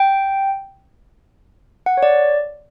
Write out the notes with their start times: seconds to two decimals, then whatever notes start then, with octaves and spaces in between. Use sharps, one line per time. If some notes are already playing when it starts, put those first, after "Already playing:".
Already playing: G5
1.86 F#5
1.97 C#5
2.03 D5